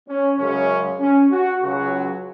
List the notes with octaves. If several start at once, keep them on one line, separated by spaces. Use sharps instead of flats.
C#4
F#2 C#3 G#3 C#4
C#4
F#4
C#2 C#3 F#3 F#4